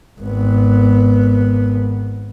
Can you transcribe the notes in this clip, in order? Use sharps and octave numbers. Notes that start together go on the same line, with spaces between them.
G#1 B3